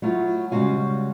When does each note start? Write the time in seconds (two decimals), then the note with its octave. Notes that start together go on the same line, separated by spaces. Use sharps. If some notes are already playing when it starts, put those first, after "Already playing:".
0.02 F#3 A3 E4 F4
0.51 C#3 G3 G#3 F#4 F5 G#5